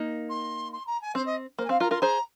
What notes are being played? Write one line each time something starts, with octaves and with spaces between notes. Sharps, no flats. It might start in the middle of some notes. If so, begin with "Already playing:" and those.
Already playing: A#3 D#4
C6
C6
A#5
G#5
C4 C5
D#5
A#3 C5
G#5
C4 F5
F4 A#4 A#5
F4 A#4 C6
G#4 C5 A#5